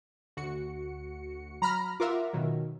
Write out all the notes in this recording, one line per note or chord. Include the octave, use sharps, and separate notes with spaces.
D2 F#4 C#7
F#3 A#5 B5 F6
F4 A#4 E5 F#5 D6
B2 D#3 F#3